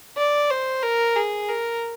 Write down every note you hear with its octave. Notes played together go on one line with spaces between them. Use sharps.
D5
C5
A#4
G#4
A#4